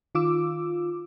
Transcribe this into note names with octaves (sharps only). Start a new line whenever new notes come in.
D#3 F4 D6 E6